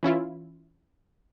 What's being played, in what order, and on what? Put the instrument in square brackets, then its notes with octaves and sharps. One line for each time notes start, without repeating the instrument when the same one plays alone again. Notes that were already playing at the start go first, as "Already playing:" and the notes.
[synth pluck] E3 C#4 E4 F4